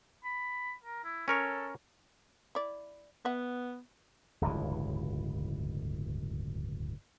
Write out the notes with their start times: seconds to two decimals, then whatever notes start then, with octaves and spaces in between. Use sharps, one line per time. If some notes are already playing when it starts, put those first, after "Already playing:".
0.24 B5
0.84 A#4
1.04 E4
1.28 C#4 A4 A#4 C#5
2.55 E4 D5
3.25 B3 E5 F#5
4.41 D1 G1 C#2 E3